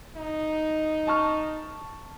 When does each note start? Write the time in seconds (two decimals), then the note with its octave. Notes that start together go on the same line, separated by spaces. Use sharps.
0.16 D#4
1.07 A5 C#6 F6